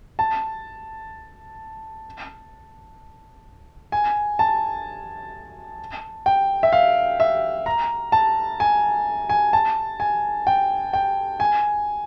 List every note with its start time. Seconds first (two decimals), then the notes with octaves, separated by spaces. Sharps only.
0.19 A5
3.92 G#5
4.39 A5
6.26 G5
6.63 E5
6.73 F5
7.20 E5
7.66 A#5
8.12 A5
8.60 G#5
9.29 G#5
9.53 A5
10.00 G#5
10.47 G5
10.93 G5
11.40 G#5